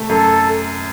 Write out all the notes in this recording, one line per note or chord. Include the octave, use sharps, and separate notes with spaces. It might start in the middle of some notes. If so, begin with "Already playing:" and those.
Already playing: C3 A3
F#2 A4